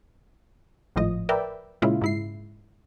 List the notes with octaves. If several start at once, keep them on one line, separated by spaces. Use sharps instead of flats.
G#1 A2 F3 D#5
A#4 B4 D5 E5 G5
A#2 C#3 G#3 C#4 E4 F4
G#2 E4 C7